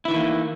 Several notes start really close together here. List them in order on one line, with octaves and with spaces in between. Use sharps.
E4 E3 D#3 A3 A#3